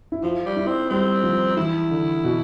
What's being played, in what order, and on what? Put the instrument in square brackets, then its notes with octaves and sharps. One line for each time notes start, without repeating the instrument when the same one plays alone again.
[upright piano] E4
[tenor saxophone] F3 [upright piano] F4
[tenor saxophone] G3
[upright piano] E4
[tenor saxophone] C4
[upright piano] G3 [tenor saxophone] C4
[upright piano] F3
[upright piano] E3 [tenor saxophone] E4
[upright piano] D3
B2